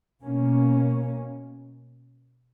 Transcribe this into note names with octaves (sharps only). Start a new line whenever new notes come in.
B2 A#3 C#4